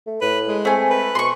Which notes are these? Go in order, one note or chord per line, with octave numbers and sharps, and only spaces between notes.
A3
A2 B4
G#3
A3 C4 G#5
B4
B2 C6 C#6